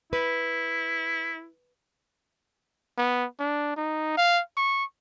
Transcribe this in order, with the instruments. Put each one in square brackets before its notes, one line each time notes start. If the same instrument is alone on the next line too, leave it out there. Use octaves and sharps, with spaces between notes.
[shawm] E4 [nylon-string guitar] B4
[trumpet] B3
D4
D#4
F5
C#6